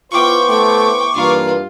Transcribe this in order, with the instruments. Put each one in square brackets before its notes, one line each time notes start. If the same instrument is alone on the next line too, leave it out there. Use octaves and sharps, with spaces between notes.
[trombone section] B3 E4 C5 [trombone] F4 [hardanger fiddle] G5 [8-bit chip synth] C#6 D6
[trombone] A3 [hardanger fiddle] G5
[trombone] G2 [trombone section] E3 A#3 [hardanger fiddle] F4